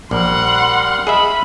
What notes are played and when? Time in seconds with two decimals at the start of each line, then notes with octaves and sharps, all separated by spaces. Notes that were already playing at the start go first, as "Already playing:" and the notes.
0.11 A#1 G3 A#4 F#5 C6
1.07 G#4 D#5 E5 B5